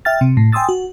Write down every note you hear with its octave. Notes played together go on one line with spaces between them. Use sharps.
E5 G5 F6 A6
C3
A2
G5 G#5 C6 D#6 E6 A6
F#4